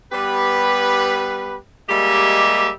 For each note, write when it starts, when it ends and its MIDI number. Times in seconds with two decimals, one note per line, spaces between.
0.12 1.57 55
0.12 1.57 59
0.12 1.57 67
0.12 1.57 71
1.89 2.70 55
1.89 2.70 56
1.89 2.70 58
1.89 2.70 67
1.89 2.70 75
1.89 2.70 76